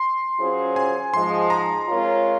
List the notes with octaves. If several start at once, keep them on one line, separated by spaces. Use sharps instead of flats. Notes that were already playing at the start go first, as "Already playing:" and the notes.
Already playing: C6
F#3 C#4 F4 G#4 C5
G#5
G#2 F3 G#3 C6
A#5
G#3 C4 F4 A#4 C#5